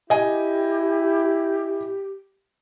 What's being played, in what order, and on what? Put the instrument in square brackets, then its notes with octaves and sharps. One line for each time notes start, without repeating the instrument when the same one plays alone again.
[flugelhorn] E4 [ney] G4 [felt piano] D#5 G#5